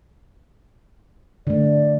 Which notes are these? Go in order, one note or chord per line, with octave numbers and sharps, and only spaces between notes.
D3 A3 D5